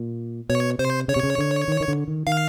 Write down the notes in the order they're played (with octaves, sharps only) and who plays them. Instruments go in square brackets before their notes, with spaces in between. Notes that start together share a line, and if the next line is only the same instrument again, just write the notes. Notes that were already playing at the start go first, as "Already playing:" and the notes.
Already playing: [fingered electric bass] A#2
[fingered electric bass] B2 [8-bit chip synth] C#5
[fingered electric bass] C3 [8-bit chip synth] C5
[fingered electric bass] C#3 [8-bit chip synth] C#5
[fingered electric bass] C3
C#3
D3
D#3
D#3
D3
D#3
[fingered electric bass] D#3 [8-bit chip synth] F5